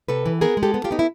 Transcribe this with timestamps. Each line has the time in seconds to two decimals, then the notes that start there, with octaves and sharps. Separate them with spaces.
0.08 C3 A4 B4
0.26 E3
0.41 B3 G#4 A#4
0.57 G#3
0.63 G4 A4
0.74 B3
0.84 F4 G4
0.91 B3 D#4
0.99 E4